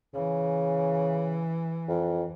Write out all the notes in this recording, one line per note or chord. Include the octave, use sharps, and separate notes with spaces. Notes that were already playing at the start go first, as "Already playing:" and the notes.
C#3 E3
F2